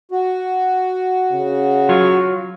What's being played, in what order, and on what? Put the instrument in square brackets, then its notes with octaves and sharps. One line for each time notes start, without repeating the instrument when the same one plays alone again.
[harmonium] F#4
[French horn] C#3
[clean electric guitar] F#3 F4 C#5